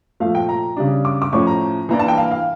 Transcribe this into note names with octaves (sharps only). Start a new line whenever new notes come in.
A#2 F3 A3 F5
G5
A#5
C#3 G3 D4
D6
D6
A2 F3 C#4 C#6
A#5
E3 A#3 D4 A#5
A5
G5
F5
F5